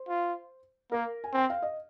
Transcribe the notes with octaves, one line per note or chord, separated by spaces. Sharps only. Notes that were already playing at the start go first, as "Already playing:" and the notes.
Already playing: C5
F4
A#3 A#4
G#5
C4 G5
F5
D#5